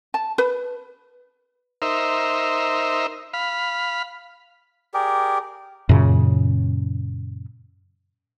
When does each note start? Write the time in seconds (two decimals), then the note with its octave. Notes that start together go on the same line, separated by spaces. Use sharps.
0.14 A5
0.38 B4
1.82 D#4 A#4 C5 E5
3.34 F5 B5
4.94 G4 G#4 A#4 D5
5.89 F#2 A#2 C#3